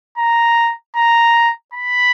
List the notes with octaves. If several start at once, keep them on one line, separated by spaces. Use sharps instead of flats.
A#5
A#5
B5